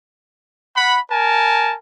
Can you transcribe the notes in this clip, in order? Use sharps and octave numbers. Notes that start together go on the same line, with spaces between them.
F#5 B5
A#4 G#5 A5